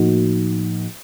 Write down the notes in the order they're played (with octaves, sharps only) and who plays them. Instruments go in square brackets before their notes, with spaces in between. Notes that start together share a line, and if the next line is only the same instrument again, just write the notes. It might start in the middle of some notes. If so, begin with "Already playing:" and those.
Already playing: [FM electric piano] A2 F3 A#3 D#4 F#4